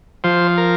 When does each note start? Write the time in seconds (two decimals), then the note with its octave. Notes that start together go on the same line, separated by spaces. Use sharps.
0.24 F3 C5
0.58 A#4